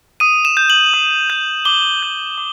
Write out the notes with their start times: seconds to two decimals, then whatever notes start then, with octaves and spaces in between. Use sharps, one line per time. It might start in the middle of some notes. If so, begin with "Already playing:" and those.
0.20 D#6 D#7
0.45 E7
0.57 G6
0.70 F#7
0.94 D#6
1.30 G6
1.65 D6 G7
2.03 G6
2.38 D6